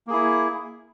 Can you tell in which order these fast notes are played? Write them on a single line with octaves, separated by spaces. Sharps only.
A#3 G#4 E4